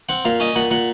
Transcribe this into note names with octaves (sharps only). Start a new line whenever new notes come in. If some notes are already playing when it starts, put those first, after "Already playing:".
C4 F#5
A#2 F5
C#4 D#5
A#2 F#5
A#2 F#5